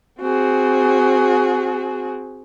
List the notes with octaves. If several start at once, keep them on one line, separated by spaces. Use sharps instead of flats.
C4 F#4 G#4